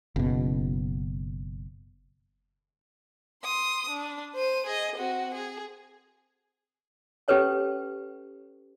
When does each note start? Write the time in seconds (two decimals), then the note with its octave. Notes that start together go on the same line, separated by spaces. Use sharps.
0.16 F#1 B2
3.44 C6 D#6
3.90 D4
4.36 C5 D#7
4.67 G#4 D#5
4.96 C4 F#4
5.35 G#4
7.28 C#4 G4 A4 B4 C#5 G#5